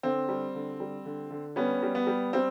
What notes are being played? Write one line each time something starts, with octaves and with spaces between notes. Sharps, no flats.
D3 C4
G3
D3
G3
D3
D3
G3 B3 C#4
G3
B3
G3
G3 C4